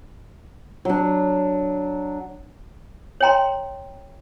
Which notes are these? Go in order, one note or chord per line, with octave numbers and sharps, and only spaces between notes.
F#3 D4
C#5 D#5 G5 A#5 C6